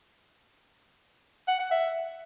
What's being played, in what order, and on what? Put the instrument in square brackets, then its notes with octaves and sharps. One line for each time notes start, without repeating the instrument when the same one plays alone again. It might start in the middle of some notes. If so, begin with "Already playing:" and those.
[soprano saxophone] F#5
F#5
E5